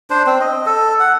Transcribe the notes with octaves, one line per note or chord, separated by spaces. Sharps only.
D4 C5
C4
D#5
A4
F#5